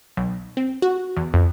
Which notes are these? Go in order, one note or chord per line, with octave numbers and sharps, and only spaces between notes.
B1
C4
F#4
E2
F2